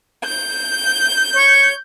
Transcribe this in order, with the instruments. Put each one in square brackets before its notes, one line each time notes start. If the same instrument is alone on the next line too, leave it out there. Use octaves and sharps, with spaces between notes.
[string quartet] G6
[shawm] C#5